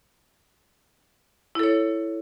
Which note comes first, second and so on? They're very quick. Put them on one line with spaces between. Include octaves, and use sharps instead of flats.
E4 A4 C#5